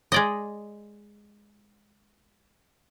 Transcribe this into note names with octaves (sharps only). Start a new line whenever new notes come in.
G#3 D5 D#5